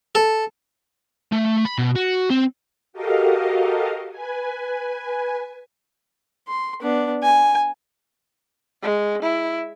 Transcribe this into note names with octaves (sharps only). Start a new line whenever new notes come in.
A4
A3
B5
B2
F#4
C4
F#4 G4 A4 A#4 D#5 F5
B4 G#5
C6
B3 D4
G#5
G#3
E4